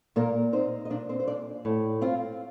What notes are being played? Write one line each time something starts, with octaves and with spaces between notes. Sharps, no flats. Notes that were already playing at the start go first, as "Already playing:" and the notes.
A#2 A#3 A#4
C4 D#4 C5
D#5
A#2 D4 D5
C4 C5
C5
A#2 D4 D5
A2
C4 F4 F5